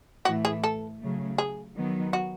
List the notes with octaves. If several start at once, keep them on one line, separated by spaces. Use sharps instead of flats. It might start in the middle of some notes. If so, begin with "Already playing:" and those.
A2 E3 A3 E4 F#4
G#4
A4
C#3 F#3 A3
G#4
D#3 F#3 B3
F#4